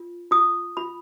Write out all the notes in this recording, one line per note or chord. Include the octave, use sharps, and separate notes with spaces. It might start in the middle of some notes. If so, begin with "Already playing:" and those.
Already playing: F4
F4 D#6
F4 B5